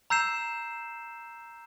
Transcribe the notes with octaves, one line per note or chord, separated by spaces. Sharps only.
A#5 E6 G6 C7 E7